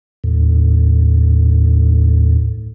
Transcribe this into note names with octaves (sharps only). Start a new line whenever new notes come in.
D#2 A2